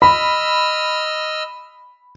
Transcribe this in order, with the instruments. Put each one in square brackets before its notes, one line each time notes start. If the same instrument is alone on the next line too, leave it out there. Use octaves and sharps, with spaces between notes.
[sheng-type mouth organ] D#5 E6 F6 [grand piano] B5